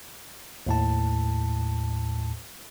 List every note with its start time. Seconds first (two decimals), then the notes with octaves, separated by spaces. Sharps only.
0.66 D#2 A2 A5